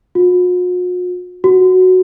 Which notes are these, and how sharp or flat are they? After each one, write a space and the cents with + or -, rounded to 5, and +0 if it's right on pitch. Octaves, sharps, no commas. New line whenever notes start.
F#4 -45
F#4 +0